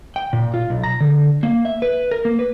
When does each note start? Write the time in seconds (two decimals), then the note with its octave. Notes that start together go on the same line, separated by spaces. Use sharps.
0.16 G5
0.33 A#2
0.54 F4
0.70 B1
0.84 A#5
1.01 D3
1.43 A#3
1.65 E5
1.82 B4
2.11 A#4
2.25 A#3
2.39 B4